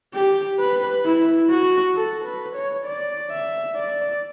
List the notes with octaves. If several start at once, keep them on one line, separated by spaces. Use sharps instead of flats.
G4
B4
E4
F#4
A4
B4
C#5
D5
E5
D5